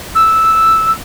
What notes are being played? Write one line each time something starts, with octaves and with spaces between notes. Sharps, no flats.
E6